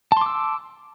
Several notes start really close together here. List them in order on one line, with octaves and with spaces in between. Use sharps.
A5 C6 D6 E6